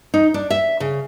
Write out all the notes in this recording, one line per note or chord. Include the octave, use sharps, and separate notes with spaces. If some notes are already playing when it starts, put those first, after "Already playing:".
D#4
D4
E5
C#3